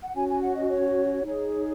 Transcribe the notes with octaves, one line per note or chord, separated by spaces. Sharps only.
F#5
C#4 F#4 C#5 G#5
G#5
F#5
D#5
C#5
D#4 G#4 C#5